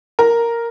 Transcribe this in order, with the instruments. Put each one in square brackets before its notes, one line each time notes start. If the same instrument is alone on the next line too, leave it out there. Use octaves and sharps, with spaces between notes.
[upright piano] A#4